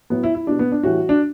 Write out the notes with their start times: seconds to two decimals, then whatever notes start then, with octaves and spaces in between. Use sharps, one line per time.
0.10 A2 F#3 B3
0.23 E4
0.35 E4
0.47 B2 G3 D4
0.59 B3
0.72 D4
0.83 A2 E3 G3 F#4
1.09 D4